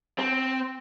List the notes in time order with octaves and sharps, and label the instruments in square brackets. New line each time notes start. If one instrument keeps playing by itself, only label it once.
[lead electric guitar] C4